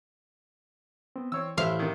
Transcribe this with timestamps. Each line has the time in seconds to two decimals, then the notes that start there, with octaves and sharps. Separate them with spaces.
1.16 B3 C4
1.32 E3 C4 C#5 E6
1.58 A1 E3 E4 C5 E5 F5
1.79 C3 D#3